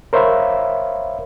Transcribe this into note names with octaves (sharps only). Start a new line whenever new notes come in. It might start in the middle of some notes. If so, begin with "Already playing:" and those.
A#4 C5 C#5 E5 F5 B5